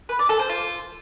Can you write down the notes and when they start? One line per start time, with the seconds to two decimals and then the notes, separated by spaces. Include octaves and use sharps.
0.09 B4
0.19 D5
0.29 A4
0.39 C5
0.49 F4